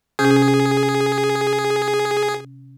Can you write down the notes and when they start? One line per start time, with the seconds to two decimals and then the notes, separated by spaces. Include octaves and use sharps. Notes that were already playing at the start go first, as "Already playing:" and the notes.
0.19 C3 C#4 G#4 G6